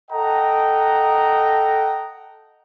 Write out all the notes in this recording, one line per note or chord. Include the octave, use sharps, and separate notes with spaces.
A4 D#5 F#5 G5 A#5